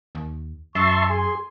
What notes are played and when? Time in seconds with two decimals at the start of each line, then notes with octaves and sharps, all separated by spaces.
0.15 D#2
0.75 F#2 E5 A5 C6 C#6
1.09 G#4 G#5 C6